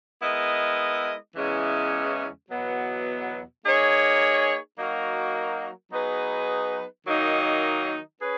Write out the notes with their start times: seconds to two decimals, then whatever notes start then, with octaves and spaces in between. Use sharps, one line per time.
0.21 G#3 B3 E4 A#4 D#5
1.35 E2 C#3 E3 G#3 C#4
2.50 E2 B2 F#3 B3
3.64 A#3 D#4 G#4 C#5
4.77 F#3 A#3 D#4 F#4 A#4
5.91 F#3 B3 D#4 G#4 B4
7.06 D#3 F#3 A#3 D#4
8.20 C#4 G#4 B4